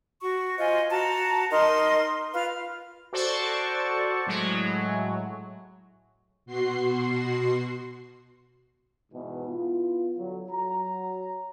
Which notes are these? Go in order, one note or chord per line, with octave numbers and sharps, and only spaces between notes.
F#4 C#6
F4 C5 D#5 G#5
F#4 A5 A#5
D#4 A#4 D#5 C6
F4 B4 F5 F6
F#4 A4 C5 D5 A5 C#6
A2 F#3 G#3
B2 F#4 C6 C7
E2 G#2 B2
B3 E4 F4
D3 F#3
F#3 A#5